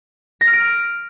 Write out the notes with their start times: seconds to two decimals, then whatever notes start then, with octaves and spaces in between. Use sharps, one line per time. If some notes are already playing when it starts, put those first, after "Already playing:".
0.41 A#6
0.47 F6
0.53 D7